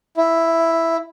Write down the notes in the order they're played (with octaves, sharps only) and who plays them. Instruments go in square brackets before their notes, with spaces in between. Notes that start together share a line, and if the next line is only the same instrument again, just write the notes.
[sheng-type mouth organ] E4